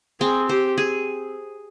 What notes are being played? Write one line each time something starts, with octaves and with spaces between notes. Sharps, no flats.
C4 G#4
G4 C5
G#4